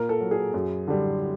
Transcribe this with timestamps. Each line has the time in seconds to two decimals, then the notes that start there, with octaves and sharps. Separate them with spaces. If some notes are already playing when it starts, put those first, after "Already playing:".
Already playing: A#2 A#4
0.09 A4
0.20 F#3
0.31 G#4
0.54 F#2
0.87 D3 G3